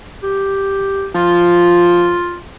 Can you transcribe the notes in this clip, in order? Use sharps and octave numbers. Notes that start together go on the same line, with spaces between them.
G4
F3 F4